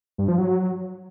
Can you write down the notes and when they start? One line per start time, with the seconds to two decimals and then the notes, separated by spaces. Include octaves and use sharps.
0.18 G2
0.28 F3
0.38 F#3